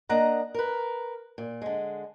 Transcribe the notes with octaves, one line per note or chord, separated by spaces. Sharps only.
A#3 D4 D#5 F#5 A#5
A#4 B4
A#2
D3 G#3